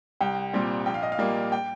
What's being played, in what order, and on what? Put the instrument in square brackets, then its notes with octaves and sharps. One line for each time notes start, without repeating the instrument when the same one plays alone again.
[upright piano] C2 G5
A#2 G3 C4
A#1 G5
F5
D#5
F5
A#2 G3 A#3
G5